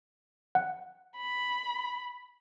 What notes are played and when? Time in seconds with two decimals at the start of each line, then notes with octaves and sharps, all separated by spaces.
0.55 F#5
1.18 B5